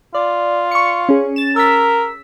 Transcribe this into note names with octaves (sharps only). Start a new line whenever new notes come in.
F4 D5
C#6 C#7
C#4 G#4
A6 E7
A#4 E6 B6